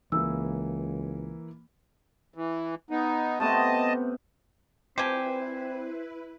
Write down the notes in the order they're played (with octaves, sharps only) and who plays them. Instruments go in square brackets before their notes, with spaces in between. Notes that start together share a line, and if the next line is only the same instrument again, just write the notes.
[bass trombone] C#2 [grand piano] E3 A#3 E4 [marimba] E6
[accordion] E3
B3 D#4
[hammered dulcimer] C3 A3 B3 [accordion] D#5 A5
[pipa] F3 G3 G4 [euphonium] C4 [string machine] E4 B4 [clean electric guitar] C5 G#5